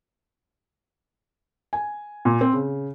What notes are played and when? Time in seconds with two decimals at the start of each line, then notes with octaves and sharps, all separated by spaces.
1.73 G#5
2.25 A#2
2.41 C4
2.53 C#3